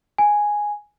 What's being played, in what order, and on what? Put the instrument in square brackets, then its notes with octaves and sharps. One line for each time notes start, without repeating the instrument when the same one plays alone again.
[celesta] G#5